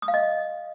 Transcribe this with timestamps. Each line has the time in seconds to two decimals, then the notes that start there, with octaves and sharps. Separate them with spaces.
0.02 D#6
0.08 F5
0.14 D#5